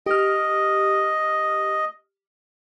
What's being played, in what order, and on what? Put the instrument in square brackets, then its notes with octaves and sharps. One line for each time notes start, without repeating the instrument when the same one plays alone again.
[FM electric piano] G4 F6 [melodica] D#5